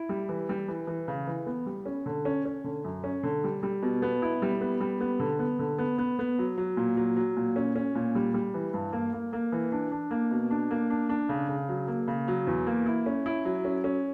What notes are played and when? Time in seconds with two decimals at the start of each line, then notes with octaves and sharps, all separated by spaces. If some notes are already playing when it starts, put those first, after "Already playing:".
Already playing: E4
0.09 G3
0.29 E3
0.49 G3
0.68 E3
0.87 E3
1.08 C#3
1.27 E3
1.46 B3
1.66 G3
1.86 C#4
2.06 D3
2.25 C#4
2.45 C#4
2.64 D3
2.84 F#2
3.04 C#4
3.23 D3
3.44 G3
3.63 G3
3.82 B2
4.02 B3
4.22 E4
4.42 G3
4.61 B3
4.80 G3
5.00 B3
5.20 D3
5.39 B3
5.59 D3
5.78 B3
5.98 B3
6.19 B3
6.39 F#3
6.58 F#3
6.77 A#2
6.97 F#3
7.17 F#3
7.37 A#2
7.56 C#4
7.76 C#4
7.95 A#2
8.15 G3
8.34 G3
8.54 E3
8.74 G2
8.93 A#3
9.13 A#3
9.33 A#3
9.52 E3
9.72 D4
9.92 D4
10.11 A#3
10.31 B2
10.51 D4
10.71 A#3
10.90 D4
11.09 D4
11.29 C#3
11.49 C#3
11.69 F#3
11.88 A#3
12.08 C#3
12.28 F#3
12.47 E2
12.67 A#3
12.86 E4
13.06 C#4
13.26 E4
13.45 F#3
13.65 C#4
13.84 C#4